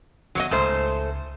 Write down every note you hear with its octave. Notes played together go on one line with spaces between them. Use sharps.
D#3 F#3 B3 C#5 D#5
C#2 G#2 A3 C5